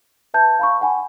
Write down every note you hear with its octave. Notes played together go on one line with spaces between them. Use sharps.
B4 E5 A5 G6
F5 B5 C#6
F#5 G#5 B5